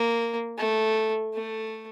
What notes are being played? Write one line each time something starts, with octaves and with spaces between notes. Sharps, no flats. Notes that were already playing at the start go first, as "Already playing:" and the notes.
Already playing: A#3
A3
A3